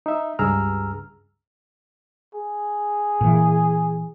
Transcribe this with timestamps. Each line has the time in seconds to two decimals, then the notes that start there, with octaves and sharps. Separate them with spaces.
0.06 D#4 E5
0.39 C#2 G2 G#4 A#5 E6 F6
2.34 G#4
3.21 A#2 E3